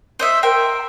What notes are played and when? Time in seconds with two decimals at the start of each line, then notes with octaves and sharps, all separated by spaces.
0.19 C5 D#5 E5
0.43 A#4 C5 G5